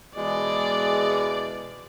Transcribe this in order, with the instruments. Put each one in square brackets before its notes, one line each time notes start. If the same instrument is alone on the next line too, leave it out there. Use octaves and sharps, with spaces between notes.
[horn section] B2 E3 G#3 [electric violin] D5